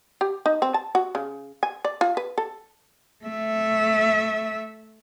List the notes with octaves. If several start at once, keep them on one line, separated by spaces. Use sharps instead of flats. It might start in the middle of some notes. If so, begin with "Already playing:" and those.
G4
D#4
C4
A5
F#4
C#3
G#5
D5
F4
B4
A4
A3 E5